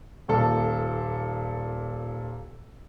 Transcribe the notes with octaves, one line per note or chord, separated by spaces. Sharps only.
D#1 A#2 A4